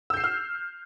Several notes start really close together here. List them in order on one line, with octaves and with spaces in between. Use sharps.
E6 G6 C7 E7 F6